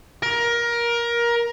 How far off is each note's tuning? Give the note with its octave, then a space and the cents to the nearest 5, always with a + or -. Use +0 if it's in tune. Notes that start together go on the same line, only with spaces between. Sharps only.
A#4 +20